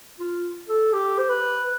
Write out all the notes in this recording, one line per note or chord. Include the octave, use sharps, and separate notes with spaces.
F4
A4
G4
C5
B4